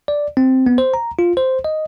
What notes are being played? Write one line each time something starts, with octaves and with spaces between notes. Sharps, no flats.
D5
C4
B3
C5
A#5
F4
C5
D#5